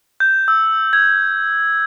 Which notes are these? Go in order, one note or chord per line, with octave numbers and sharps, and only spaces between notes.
G6
E6
G#6